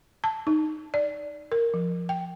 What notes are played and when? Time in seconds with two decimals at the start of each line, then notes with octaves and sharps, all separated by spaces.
0.24 A5
0.47 D#4
0.94 D5
1.52 A#4
1.74 F3
2.09 G5